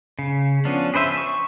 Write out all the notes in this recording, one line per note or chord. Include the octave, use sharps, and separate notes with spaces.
C#3
F3 B3 C#4 D4
G#4 B4 C5 E5
C#6